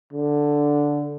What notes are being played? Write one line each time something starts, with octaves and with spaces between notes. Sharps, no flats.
D3